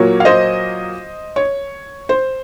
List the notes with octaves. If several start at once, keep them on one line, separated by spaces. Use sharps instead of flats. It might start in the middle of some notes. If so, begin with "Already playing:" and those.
Already playing: A#2 F#3 A#3 C#5
F5
C5 D#5
C#5
C5